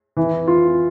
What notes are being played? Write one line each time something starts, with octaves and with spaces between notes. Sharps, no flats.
E3
F4